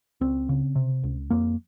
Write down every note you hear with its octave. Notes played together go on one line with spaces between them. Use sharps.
C#2 C4
C#3
C3
C#2
F2 A#3